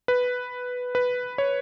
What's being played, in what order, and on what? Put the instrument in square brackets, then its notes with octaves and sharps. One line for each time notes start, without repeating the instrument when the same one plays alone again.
[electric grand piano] B4
B4
C#5